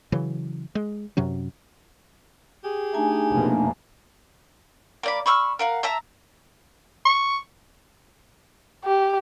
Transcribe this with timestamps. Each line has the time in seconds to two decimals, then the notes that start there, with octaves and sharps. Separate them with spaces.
0.12 C#3 E3 F#3
0.75 G#3
1.17 F#2 C3 F#3 C#4
2.64 G4 G#4
2.95 A3 D4 D#4 G#5
3.31 F1 B2 A#3
5.03 A#3 D5 B5
5.26 B5 C#6 E6 F6
5.59 A#4 F5 F#5
5.83 E5 A5 A#5 E6
7.05 C#6
8.84 G4